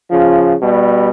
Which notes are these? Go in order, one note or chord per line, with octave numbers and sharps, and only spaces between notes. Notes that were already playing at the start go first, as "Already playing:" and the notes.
C#3 F3
B2 G3